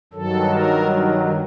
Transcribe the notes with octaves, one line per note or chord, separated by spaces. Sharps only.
G2 D#3 F#3 A4
A#4